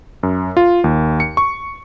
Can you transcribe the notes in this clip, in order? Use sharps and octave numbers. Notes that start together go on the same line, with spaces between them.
F#2
F4
D#2
C#7
C#6